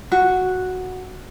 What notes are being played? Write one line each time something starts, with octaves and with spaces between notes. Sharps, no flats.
F#4